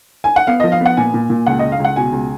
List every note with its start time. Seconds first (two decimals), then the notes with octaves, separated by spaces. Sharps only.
0.24 G#5
0.36 F#5
0.47 B3 F5
0.60 F3 D#5
0.72 F5
0.81 B3 F#5
0.97 A#2 G#5
1.14 A#2
1.30 A#2
1.46 C#2 F#5
1.59 C#2 D#5
1.72 F5
1.80 C#2 F#5
1.96 B2 G#5
2.13 C#2